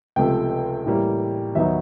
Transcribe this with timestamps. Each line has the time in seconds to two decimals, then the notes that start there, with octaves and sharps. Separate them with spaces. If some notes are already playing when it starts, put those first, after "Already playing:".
0.16 C#2 C3 F3 A3 G5
0.86 A2 E3 G3 A#3
1.55 D#2 D#3 F#3 B3 D#4 E5